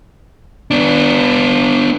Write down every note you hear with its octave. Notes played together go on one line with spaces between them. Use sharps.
B3 D4